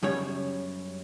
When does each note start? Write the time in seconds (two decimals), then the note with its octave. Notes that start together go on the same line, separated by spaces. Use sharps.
0.03 F#2 C#3 G3 C#5